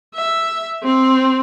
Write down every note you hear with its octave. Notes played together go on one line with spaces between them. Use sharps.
E5
C4